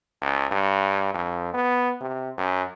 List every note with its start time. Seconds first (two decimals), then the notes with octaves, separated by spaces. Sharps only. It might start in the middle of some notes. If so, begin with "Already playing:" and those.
0.22 C#2
0.51 G2
1.14 F2
1.53 B3
2.01 C3
2.38 F#2